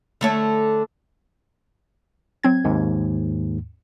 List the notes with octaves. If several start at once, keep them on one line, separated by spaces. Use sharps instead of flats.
D3 A3 C#5
F#3 C4 G#6
D#2 G#2